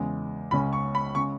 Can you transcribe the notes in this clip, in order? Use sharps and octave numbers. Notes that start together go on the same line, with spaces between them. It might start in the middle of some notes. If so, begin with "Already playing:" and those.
Already playing: E2 C#3 G#3
C#2 C#3 G#3 C#4 B5
C#6
B5
C#3 G#3 C#6